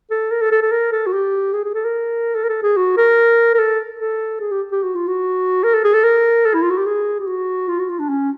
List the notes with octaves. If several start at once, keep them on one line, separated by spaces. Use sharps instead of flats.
A4
A#4
A4
A4
A4
A#4
A4
F#4
G4
G#4
G#4
A4
A#4
A4
A#4
A4
G#4
F#4
A#4
A#4
A4
A4
G#4
G4
G4
F#4
F4
F#4
A#4
A4
G#4
A4
A#4
A4
E4
F4
F#4
G4
G#4
G4
F#4
F4
F#4
F4
D4
C#4